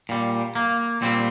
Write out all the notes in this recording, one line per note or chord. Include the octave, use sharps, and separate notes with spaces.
A#2 G3
A#3
A#2 G3 C4